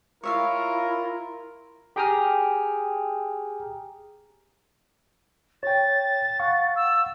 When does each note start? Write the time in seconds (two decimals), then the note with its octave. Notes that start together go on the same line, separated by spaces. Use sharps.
0.24 E4 F4 A#4 C#5 E5 F5
1.96 G4 G#4 G5 A#5 D#6 F6
5.63 C#5 G5 A6
6.40 F5 F#5 C#6
6.76 E6